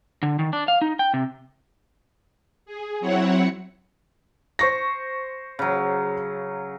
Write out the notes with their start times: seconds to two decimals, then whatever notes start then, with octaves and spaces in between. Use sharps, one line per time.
0.23 D3
0.39 D#3
0.53 D4
0.68 F5
0.82 D#4
0.99 G5
1.14 C3
2.66 G#4
3.00 F#3 C4 E4 C#5 F#5
4.59 C5 C#6 A#6
5.59 C#3 F#3